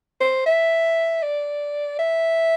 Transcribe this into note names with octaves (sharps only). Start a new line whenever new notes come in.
C5
E5
D5
E5